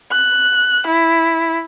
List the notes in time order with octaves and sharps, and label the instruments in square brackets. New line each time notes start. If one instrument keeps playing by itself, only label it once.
[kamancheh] F#6
E4